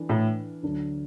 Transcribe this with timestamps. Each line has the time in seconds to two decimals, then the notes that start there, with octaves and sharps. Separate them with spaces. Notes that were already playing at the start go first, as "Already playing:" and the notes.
Already playing: E3 D4 A4
0.09 A2
0.63 D2 D3 F#3 D4 A4